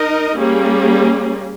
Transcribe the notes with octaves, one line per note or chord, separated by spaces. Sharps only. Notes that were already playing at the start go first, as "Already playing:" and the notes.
Already playing: D#4 A#4 D#5
G3 A#3 C#4 G#4